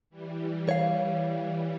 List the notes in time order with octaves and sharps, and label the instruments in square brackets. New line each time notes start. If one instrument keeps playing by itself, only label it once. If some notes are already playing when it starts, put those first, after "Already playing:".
[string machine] E3 G3
[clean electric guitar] C#5 F5